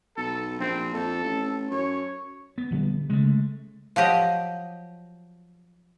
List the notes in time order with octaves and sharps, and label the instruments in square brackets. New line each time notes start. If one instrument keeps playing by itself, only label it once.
[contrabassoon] B1 [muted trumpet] A4
[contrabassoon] A#1 [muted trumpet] C4
[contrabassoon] F2 [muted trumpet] A4
[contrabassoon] A1
[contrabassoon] F#2 [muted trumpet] C#5
[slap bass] B3
[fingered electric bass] A#1 D3 G3
[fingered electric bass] C#3 [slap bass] G#3 A3
[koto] F3 F#3 G4 D#5